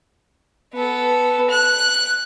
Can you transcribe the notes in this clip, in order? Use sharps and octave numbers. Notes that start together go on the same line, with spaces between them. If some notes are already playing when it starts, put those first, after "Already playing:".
B3 A4
F#6